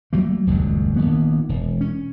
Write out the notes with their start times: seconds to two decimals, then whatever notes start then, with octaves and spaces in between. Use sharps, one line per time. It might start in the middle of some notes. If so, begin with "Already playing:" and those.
0.13 F#3 G3 A3 A#3
0.47 D#1 C#2 F#2 F#3
0.96 A#1 D#3 A#3 B3
1.49 E1
1.81 C#4